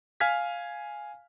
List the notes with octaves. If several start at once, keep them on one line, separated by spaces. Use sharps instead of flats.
F5 G#5 F6 G#6 B6